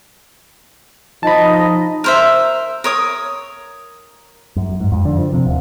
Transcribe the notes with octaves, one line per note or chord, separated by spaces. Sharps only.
F3 D#4 D#5 A5 B5
A#4 C5 E5
A#4 C#5 D#6
F#2
G#2
F2
D3
F3
C3
D#1